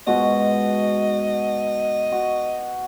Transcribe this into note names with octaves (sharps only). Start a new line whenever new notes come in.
G#2 B2 F#4 D#5
F#4